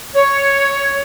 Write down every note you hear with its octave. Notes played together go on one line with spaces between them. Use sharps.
C#5